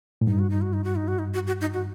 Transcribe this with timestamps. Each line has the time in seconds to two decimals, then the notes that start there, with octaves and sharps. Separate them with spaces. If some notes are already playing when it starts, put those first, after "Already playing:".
0.21 A2
0.27 G2 D#4
0.39 F#4
0.50 D#4
0.61 F#4
0.73 D#4
0.84 F#4
0.96 D#4
1.08 F#4
1.19 D#4
1.34 F#4
1.47 F#4
1.61 D#4
1.74 F#4